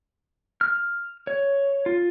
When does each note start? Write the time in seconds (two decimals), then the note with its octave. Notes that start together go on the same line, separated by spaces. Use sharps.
0.61 F6
1.27 C#5
1.86 F4